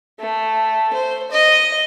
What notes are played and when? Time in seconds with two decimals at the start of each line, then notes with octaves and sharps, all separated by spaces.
0.20 A3
0.93 C5
1.31 D#5